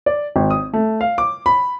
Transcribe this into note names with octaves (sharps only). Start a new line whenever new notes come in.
D5
G#1
D#6
A3
F5
D6
B5